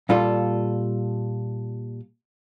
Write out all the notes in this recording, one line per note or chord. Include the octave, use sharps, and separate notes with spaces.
A#2 G3 F4 A4